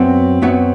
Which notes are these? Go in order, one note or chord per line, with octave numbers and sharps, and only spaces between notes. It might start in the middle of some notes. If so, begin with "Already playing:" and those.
Already playing: F#2 F#3 B3 C4 F#4
F#2 F#3 B3 F#4